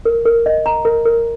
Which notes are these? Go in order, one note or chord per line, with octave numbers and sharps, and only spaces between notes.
A#4
A#4
D#5
A#5
A#4
A#4